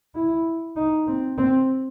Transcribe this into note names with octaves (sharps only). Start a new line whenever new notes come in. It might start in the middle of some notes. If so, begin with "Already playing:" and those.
E4
D#4
C4
C4